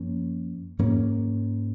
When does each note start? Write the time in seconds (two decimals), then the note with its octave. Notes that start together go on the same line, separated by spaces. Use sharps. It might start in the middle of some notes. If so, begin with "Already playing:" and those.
Already playing: F#2 F3 A#3 C#4
0.79 G#2 F#3 A#3 C#4